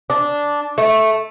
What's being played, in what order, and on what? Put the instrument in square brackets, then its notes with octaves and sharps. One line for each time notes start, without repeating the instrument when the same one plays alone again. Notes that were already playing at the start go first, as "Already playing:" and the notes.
[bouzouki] D4
A3